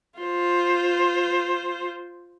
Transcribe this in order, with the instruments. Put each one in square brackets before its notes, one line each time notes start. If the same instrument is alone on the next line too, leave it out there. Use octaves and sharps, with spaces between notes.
[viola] F4 C5